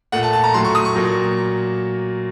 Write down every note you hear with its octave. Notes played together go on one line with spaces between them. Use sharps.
A#2 A3 F#5
A5
A5
A#5
A2 F#3 A3 C6
C#6
D#6
C#6
A#2 F#3 A#3